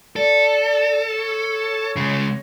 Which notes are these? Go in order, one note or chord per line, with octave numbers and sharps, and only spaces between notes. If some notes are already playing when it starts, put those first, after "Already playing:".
A4 D5
D5
C#5
C#3 G#3